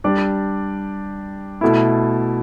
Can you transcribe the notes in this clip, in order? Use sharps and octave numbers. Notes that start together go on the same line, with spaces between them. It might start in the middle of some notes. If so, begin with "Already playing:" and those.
G3 D4 G4 D5
B2 A3 E4